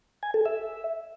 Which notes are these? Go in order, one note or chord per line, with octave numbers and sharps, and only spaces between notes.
G#5
A4
E5